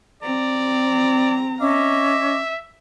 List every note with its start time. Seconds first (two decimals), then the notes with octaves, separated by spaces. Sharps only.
0.23 C4 D5 A#5
1.61 C#4 D#5 E5 D6